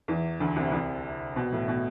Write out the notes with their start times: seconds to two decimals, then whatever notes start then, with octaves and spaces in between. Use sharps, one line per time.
0.08 E2 E3
0.40 D2 D3
0.56 C2 C3
0.71 C2 C3
1.36 B2
1.52 A2
1.68 B2